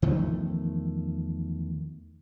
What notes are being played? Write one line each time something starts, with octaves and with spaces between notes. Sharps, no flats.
E2 D#3 F3 A3